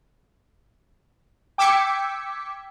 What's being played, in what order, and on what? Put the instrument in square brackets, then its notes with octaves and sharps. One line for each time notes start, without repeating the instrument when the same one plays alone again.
[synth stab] G5 D6 E6 G#6 B6 C#7